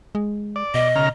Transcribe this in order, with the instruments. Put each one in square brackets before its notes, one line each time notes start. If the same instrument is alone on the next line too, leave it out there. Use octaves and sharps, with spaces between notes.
[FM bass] G#3
[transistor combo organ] D5
[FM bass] B2 [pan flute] D#5
[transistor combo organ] C#3 A#5 F6